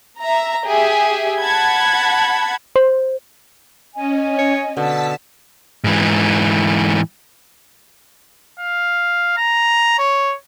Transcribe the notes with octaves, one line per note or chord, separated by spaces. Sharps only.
E5 A#5
G4 G#4 E5
F#5 A5 B5 G#6
C5
C#4 D#5 G#5
C#5
B2 D3 A5 E6 B6
G#2 E3
F5
A#5
C#5